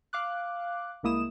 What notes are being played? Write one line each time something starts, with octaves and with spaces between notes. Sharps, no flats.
F5 D6 F#6
C2 G#3 A#3 E4 D#6 E7